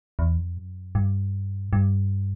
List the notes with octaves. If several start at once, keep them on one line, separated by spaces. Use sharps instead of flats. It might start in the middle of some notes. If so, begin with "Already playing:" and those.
E2
F2
F#2
G2
G2